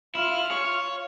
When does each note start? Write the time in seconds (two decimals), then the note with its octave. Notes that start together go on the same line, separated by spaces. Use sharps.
0.15 E4 F4 F6
0.51 C#5